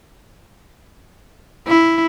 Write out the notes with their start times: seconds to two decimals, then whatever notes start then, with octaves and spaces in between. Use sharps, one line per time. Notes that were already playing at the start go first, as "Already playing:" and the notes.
1.68 E4